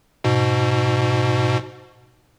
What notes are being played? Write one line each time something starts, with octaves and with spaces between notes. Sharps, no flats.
G#2 B2